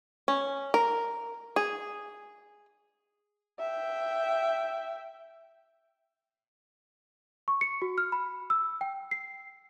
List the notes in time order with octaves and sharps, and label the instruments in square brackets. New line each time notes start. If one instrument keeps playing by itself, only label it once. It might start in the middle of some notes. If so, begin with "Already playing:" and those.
[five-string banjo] C#4
A#4
G#4
[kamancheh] E5 G5
[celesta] C#6
C#7
F#4
F6
B5
E6
G5
C7